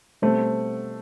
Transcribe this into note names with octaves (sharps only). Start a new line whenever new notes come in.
B2 G3 A3 C4